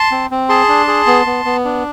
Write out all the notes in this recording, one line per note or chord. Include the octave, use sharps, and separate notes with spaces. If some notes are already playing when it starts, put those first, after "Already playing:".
Already playing: A5 C6
C4
C4
G#4 A5 C6
D4
G#4
B3
B3
B3
D4